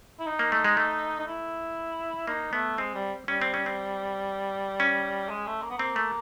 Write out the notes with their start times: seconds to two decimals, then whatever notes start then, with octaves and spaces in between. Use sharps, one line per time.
0.20 E4
0.26 D#4
0.39 A#3
0.52 A3
0.64 G#3
0.77 A3
1.20 D#4
1.27 E4
2.27 A#3 D#4
2.53 A3 B3
2.78 G#3 C4
2.95 G3
3.28 G3 C#4
3.42 C4
3.54 C#4
3.66 C4
4.80 C#4
5.29 G#3
5.47 A3
5.63 A#3
5.70 B3
5.78 A#3 C4
5.96 A3